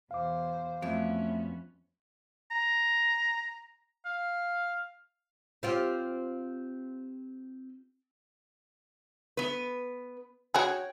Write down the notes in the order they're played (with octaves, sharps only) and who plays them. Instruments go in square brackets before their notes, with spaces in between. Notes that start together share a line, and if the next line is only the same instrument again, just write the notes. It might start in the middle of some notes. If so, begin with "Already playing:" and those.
[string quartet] E2 B2 C5 [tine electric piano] F5 D6
[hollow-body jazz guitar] F2 [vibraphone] A3 E5 [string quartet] B3 C#4 F#4
[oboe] A#5
F5
[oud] C4 F4 G4
[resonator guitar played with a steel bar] B3 B4
[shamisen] F#4 G#4 [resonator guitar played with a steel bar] C#5 G5